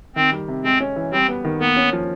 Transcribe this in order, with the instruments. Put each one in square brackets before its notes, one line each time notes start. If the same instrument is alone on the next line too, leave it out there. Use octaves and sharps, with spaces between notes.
[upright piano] D#3 [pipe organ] C4
[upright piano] G3
C3
[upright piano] G#3 [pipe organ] C4
[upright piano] C#4
E3
[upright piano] G3 [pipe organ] C4
[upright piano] B3
D#3
[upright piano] A#3 [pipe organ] B3
[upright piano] C#4
F3